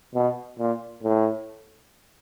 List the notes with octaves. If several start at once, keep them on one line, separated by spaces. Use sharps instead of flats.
B2
A#2
A2